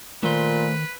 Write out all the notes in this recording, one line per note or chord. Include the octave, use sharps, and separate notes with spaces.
A#2 D#3 A3 B4 C5